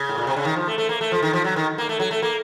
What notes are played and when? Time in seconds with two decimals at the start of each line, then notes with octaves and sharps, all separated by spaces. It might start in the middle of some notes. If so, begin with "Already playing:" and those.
Already playing: C#3
0.09 A2
0.18 A#2
0.27 C3
0.36 C#3
0.45 D#3
0.56 F3
0.67 A3
0.78 A3
0.89 A#3
1.01 A3
1.12 F3
1.22 D#3
1.33 F3
1.44 F#3
1.56 D#3
1.78 A#3
1.89 A3
2.00 F#3
2.11 A3
2.22 A#3